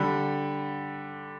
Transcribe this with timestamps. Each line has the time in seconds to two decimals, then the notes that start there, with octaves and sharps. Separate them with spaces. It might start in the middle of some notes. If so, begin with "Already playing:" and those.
Already playing: D3 G3 B5